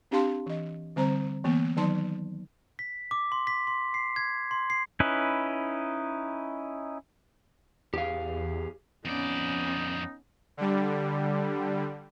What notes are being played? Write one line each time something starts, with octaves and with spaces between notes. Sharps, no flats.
C4 D4 G4 F5 A5 C6
E3 D#5
D3 G3 C4 C5 A#5
E3 A#3 B3
D#3 F#3 D#4 D5 A5 C6
B6
D6
C6
B6
C6
C7
G#6
C6
C7
C#4 D#4 E4 B4
E2 G4 G#4 F5
F2 B3 C#4 D#4 D5
D3 G3